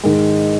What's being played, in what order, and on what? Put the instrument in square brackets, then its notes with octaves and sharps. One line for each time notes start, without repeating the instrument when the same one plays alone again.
[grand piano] G#2 D#3 G#3